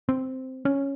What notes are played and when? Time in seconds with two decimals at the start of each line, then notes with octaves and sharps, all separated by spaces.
0.09 C4
0.65 C#4